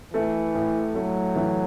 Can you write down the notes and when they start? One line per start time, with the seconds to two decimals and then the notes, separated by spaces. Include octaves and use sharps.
0.13 E3 A3
0.54 A2
0.95 F#3 A3
1.36 E3